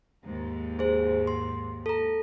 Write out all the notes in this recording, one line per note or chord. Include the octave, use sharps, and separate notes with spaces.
D#2 G#2
G#4 C5
C6
A4 A#5